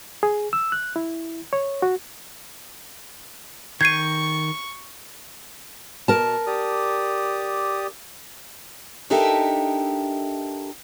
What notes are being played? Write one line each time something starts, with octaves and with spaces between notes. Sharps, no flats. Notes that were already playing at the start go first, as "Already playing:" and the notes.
G#4
E6
F#6
E4
C#5
F#4
D#3 C#6 G6 G#6 C7 D#7
B2 A#4 A5
G4 D5 D#6
D4 D#4 G4 A4 A#4 E5